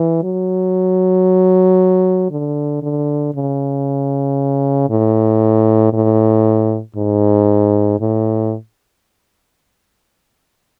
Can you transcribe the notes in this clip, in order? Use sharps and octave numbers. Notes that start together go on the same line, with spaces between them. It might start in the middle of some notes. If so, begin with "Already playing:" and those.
Already playing: E3
F#3
D3
D3
C#3
A2
A2
G#2
A2